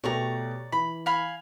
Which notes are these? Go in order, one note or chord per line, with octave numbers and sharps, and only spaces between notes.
B2 A3 G4 C#5 D5 A#5
E3 B5
F5 G#5 B5